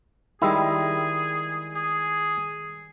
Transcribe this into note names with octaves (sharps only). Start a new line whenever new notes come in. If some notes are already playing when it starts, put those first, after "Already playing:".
D#3 G3 G#3 E4 G#4
G#4